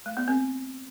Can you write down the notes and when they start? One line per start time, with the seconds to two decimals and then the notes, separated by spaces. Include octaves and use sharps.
0.06 A3
0.17 B3
0.28 C4